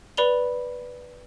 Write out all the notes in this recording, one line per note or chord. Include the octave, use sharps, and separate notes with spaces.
B4 D5 B5 F7 G7